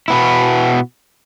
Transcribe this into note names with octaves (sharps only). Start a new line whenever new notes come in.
B2 B3 E4